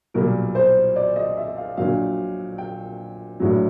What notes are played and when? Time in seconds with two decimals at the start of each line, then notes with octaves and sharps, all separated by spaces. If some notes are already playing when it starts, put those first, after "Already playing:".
0.14 B1 A#2 G3 A#4
0.55 C5
0.96 D5
1.16 D#5
1.37 E5
1.57 F5
1.77 A#1 A#2 F#3 F5
2.58 G5
3.40 A#1 A2 F#3